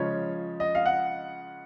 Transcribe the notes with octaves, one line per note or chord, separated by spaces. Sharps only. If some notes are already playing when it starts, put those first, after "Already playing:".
Already playing: C#3 F3 G#3 C#5
D#5
F5
F#5